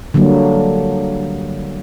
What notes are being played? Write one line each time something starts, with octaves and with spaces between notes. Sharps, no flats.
D3 F#3 G3 A#3